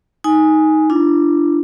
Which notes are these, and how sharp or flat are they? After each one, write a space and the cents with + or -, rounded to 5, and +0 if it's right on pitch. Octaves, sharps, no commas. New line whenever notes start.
D#4 +10 G#5 +0
D4 +0 F4 -45